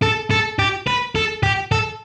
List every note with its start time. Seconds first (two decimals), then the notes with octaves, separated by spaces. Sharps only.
0.03 A4
0.31 A4
0.59 G4
0.87 B4
1.16 A4
1.43 G4
1.72 A4